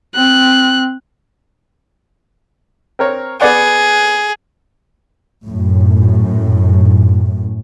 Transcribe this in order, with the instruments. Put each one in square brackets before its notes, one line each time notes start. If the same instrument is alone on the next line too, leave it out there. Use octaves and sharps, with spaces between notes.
[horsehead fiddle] C4 [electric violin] F#6
[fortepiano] C4 A#4 C#5
[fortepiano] B3 D5 F#5 [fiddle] G#4
[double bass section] F#2 A2